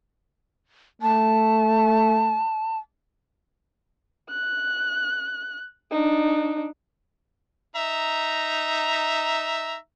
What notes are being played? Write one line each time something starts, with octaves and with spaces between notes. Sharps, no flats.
A3 A5
F#6
D4 D#4
D#4 E5 A#5